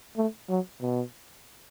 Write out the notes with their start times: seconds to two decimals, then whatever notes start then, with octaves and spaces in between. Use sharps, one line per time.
0.17 A3
0.49 F#3
0.82 B2